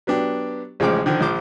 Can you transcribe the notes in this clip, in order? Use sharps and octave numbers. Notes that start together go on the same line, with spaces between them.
F#3 B3 D4 G4
A1 C#3 F3 G#3 G5 D6
D3 D#3 F3
A#1 F3 C5 D6